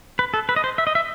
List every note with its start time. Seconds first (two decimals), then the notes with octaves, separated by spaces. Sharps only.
0.19 B4
0.34 A4
0.49 B4
0.56 D#5
0.64 C5
0.78 E5
0.87 D#5
0.95 E5